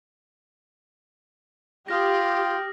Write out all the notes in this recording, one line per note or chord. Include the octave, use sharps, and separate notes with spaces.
F4 G4 G5 D#6 F6 A#6